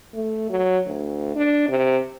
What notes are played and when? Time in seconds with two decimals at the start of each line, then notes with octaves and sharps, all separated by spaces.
0.14 A3
0.50 F#3
0.86 D2
1.35 D4
1.69 C3